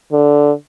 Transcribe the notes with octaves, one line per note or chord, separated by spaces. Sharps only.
D3